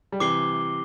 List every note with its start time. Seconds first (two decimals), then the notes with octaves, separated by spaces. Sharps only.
0.12 G3
0.20 C3 E3 D6 C7 G7